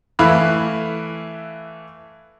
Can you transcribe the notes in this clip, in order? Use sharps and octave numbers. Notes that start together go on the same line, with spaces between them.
E3 A3 E4 F5 B5 F#6